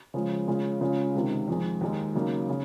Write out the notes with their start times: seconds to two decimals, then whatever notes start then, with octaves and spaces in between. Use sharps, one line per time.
0.14 C#3 F3 G#3
0.47 C#3 G#3 C#4 F4
0.81 C#3 G#3 C#4 F4
1.15 C#2 C3 D#3
1.48 F2 D#3 G#3
1.81 D#2 D#3 G#3 D#4
2.15 C#3 F#3 A#3 D#4
2.49 C#3